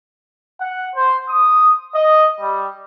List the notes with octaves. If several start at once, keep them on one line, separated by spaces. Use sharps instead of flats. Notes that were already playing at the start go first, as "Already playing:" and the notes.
F#5
C5
D#6
D#5
G3